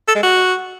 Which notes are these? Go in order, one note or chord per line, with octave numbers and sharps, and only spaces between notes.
A4
G#3
F#4